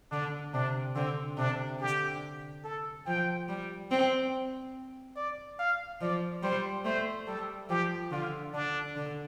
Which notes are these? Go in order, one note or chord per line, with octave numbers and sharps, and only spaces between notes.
D3 D4
C3 D4
D3 C4
C3 D4
D3 G4
A4
F3 G5
G3
C4
D5
F5
F3 D5
G3 C5
A3 C5
G3 A4
F3 G4
D3 F4
D3 D4
D3